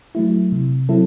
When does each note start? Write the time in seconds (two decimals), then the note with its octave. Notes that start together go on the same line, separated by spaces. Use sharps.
0.15 F#3 A3 E4
0.52 C3
0.89 F#3 C4 E4 A4